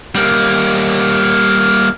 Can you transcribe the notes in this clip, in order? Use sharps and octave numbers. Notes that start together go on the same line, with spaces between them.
G3 A#3